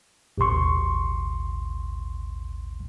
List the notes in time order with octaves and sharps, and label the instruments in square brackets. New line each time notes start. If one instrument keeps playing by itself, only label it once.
[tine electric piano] A1 D#2 B2 C6 C#6